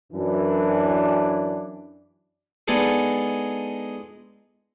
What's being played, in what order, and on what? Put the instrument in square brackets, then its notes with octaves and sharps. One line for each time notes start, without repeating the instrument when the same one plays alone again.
[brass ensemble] F#2 E3 D4
[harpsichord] G#3 B3 D4 D#4 G#4 A4